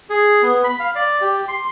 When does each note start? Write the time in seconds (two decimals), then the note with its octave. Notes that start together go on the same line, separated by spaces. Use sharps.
0.10 G#4
0.43 B3
0.64 B5
0.80 F5
0.95 D5
1.21 G4
1.48 C6